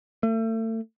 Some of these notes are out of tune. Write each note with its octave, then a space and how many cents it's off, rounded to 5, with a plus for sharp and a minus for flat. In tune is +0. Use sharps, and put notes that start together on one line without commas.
A3 +35